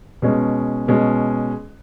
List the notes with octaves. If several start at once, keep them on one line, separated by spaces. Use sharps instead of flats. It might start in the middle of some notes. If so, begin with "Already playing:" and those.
B2 G#3 C#4
B2 G#3 C#4